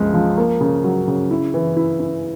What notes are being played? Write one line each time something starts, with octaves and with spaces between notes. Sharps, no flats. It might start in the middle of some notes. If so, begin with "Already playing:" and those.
Already playing: C#2 F3 G#3
F3
A#3
C#3
F#3
C#3
E4
E3
E4
E4